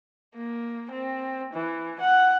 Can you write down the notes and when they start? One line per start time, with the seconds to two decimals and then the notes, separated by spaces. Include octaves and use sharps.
0.36 A#3
0.91 C4
1.53 E3
2.00 F#5